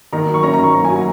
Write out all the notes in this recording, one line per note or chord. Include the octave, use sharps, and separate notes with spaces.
D#3 A#5
F#3
C#6
C#4 A#5
A#5
D#3 C#6
F#3 A#5
G#5
F#3
A#5